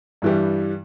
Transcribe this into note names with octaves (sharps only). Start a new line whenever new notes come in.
G2 E3 G3